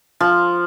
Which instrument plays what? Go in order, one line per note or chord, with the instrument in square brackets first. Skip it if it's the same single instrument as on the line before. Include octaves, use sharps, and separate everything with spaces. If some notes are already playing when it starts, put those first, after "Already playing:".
[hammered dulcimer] F3